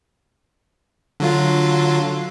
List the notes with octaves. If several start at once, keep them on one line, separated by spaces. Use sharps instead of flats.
D3 F#3 F4